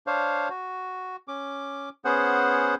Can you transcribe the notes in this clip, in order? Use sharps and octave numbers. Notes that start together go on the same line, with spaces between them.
D4 C5 C#5 F5
F#4
C#4 D6
B3 C#4 G#4 C5 F#5